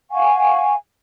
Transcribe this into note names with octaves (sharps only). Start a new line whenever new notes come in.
F5 F#5 G#5 C#6